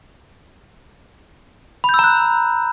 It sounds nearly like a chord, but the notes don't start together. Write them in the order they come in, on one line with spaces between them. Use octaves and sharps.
B5 G6 E6 A#5 F#6